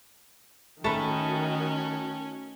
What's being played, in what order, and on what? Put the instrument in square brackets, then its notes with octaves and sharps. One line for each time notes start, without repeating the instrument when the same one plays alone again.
[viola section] D#3 F#4 [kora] A3 B4 [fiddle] C#4 [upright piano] A5